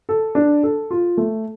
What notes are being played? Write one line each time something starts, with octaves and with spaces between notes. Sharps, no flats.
A4
D4
A4
F4
A3